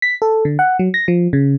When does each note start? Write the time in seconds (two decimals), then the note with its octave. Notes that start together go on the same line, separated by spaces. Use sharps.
0.02 B6
0.22 A4
0.45 D3
0.59 F#5
0.79 F#3
0.94 A#6
1.08 F3
1.33 C#3